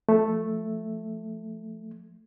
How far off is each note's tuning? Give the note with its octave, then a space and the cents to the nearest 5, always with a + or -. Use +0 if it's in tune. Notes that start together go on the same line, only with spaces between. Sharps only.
F3 +5 A3 +0